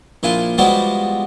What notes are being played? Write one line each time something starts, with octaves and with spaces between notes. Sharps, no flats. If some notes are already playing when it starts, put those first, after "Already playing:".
A#1 E4 F4 G#5
F3 G3 G#3 B3 E4 F#4